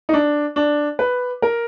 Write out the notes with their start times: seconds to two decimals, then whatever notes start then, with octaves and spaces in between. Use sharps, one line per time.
0.09 D#4
0.13 D4
0.56 D4
0.99 B4
1.42 A#4